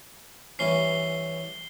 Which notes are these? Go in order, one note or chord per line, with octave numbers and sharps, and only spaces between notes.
G2 E3 C#4 C7 G7